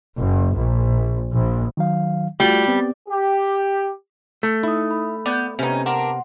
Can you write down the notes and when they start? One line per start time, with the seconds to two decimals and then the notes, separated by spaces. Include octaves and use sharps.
0.18 F#1
0.56 A#1
1.34 A#1
1.77 D#3 F#3 F5
2.40 G3 A3 F4 F#4
2.68 B3 C4 G4
3.08 G4
4.43 A3
4.63 D#4 E4 D#6
4.91 B5
5.26 B3 D5 G6
5.59 C3 B3 C#4 D#4
5.86 D4 A#4 F#5 A#5 C6